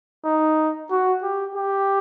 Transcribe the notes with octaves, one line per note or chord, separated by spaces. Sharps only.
D#4
F#4
G4
G4